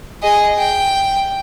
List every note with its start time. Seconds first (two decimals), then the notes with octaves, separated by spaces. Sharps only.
0.22 G#4 D#5
0.58 G5